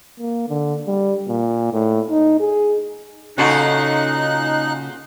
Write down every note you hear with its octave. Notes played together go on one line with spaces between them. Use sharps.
A#3
D3
G3
A#2
A2
D#4
G#4
A#2 C#3 C#4 D#4 F#4 A4 C6 F#6